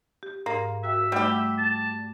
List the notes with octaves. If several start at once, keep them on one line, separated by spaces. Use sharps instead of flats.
G4
G#2 A#3
F#4 E5 G5
G3 A3 G4 F#5 B5
A5